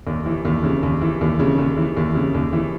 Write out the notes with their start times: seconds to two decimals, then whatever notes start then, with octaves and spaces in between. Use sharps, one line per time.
0.07 D#2
0.26 E3
0.45 D#2
0.64 C#3
0.83 D#2
1.01 E3
1.21 D#2
1.39 C#3
1.58 D#2
1.78 E3
1.97 D#2
2.15 C#3
2.34 D#2
2.53 E3